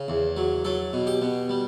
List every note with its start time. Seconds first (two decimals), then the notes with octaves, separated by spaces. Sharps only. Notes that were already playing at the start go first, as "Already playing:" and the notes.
Already playing: C#3
0.08 E2
0.37 F#3
0.65 F#3 A4
0.93 B2
1.07 G4
1.22 B2
1.49 G3